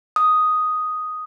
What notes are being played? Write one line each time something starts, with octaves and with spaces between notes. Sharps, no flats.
D#6